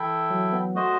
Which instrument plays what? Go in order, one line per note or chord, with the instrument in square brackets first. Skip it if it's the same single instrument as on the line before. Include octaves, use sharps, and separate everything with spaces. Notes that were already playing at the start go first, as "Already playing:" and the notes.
Already playing: [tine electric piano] E3 [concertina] E4 A4 E5 G5
[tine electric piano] F#3
B3
[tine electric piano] A3 [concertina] F#4 C5 D#5